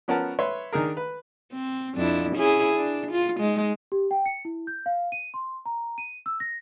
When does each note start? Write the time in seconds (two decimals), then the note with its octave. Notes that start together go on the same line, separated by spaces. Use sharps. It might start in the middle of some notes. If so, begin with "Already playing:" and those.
0.08 F3 B3 C#4 A#4 F#5 A5
0.39 B4 C#5 E5 C6
0.73 D#3 D4 G#4 A#4
0.97 B4
1.52 C4
1.95 F2 D4 E4
2.36 C#4 E4 G#4
2.75 D4
3.11 F4
3.40 G#3 D#4
3.92 G4
4.11 G5
4.26 C#7
4.45 E4
4.67 G6
4.86 F5
5.12 D#7
5.34 C6
5.66 A#5
5.98 D#7
6.26 E6
6.40 A#6